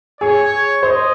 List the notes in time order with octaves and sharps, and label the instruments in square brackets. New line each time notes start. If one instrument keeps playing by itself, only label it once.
[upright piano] G#4 [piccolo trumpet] C#5
[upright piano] C5 [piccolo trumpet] D#5